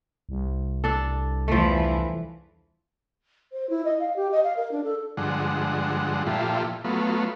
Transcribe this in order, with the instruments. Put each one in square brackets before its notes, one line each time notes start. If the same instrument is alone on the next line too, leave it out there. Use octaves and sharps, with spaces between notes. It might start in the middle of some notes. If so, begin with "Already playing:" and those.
[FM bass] C2
[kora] D4 A4
[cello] E2 E3 [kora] F3 A3
[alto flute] C5
E4
D#5
F5
G4
D#5
F5
A#4
D4
A4
[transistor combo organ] G2 D3 F3 G#3 F#5
A#2 F3 E4 F4 G4 A4
F#3 A3 B3 F4